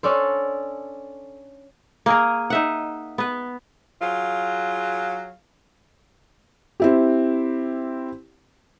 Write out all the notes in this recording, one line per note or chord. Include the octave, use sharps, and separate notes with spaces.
C#4 D4 A4 C5
A#3 G#4 A#4
D#4 E5 F#5
B3 B4
F#3 F4 G#4 F5
C4 E4 G4